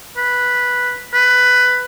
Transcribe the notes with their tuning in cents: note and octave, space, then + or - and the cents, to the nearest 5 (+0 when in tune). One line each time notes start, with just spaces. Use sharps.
B4 -5
B4 +10